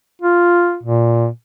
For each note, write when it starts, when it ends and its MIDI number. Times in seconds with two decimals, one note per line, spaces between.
0.22 0.78 65
0.83 1.27 46